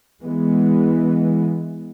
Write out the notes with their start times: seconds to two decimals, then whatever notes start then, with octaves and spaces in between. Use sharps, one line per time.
0.23 E3 G#3 B3